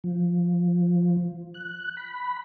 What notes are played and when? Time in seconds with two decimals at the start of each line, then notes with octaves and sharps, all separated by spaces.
0.04 F3
1.54 F#6
1.97 B5